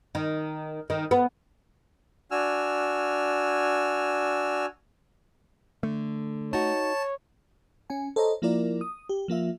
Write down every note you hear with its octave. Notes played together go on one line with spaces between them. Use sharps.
D#3
D#3
B3
D4 F#4 G#5 E6 F6
D3 A3
D#4 F#4 C#5 A5 A6
C#4 G#5
A4 C5 C#5 D#5 A#5
F3 A#3 E4 F4 A#4 D5
D#6
G4
F3 A#3 F4 E5